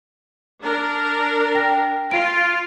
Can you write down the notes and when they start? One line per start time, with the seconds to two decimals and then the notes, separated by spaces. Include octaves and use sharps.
0.63 D4 A#4
1.55 G5 A#6
2.11 F4 D7